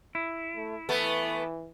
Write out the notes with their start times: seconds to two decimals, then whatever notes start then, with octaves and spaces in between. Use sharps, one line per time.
0.15 E4
0.56 A3
0.89 E3 A3 B3